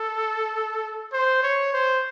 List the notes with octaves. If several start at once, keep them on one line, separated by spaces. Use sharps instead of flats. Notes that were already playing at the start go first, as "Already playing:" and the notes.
Already playing: A4
C5
C#5
C5